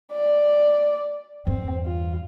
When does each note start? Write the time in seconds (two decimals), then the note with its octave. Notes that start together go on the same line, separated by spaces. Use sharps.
0.12 D5
1.47 E2 G2 C4
1.85 F4